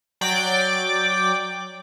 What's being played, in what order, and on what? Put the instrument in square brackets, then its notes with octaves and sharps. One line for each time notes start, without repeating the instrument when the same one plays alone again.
[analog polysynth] F#3 D5 G5 D6